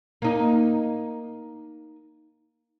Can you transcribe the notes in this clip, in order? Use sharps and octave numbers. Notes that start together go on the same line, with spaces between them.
A#3 D#4